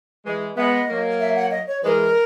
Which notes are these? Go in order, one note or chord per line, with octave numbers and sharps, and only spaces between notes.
E3 G#3
G#3 B3 D#5 E5
F#3 A#3
E5
F#5
D#5
C#5
E3 G#3 A#4 B4